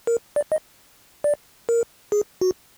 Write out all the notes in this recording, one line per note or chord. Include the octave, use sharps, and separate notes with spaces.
A#4
D5
D#5
D5
A#4
G#4
F#4